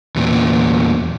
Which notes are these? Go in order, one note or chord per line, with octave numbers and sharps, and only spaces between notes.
E2 A#2